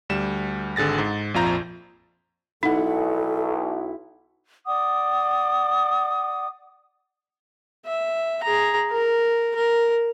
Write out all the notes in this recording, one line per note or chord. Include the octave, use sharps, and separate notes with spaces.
D2 G3 E7
G#1 D3 G#4 A6 A#6
G#2
A#1 F2 F4 A#5 G6
B1 D#4 E4 A4 F#5
D5 F#5 D6 D#6
E5
G#4 A#5
A#4
A#4